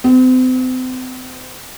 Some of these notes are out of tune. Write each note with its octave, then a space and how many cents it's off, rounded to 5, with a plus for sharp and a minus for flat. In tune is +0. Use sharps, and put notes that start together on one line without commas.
C4 -40